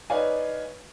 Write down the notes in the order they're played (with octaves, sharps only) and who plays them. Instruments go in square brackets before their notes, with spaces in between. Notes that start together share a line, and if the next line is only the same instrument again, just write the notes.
[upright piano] D#4 B4 C#5 D5 F5 G#5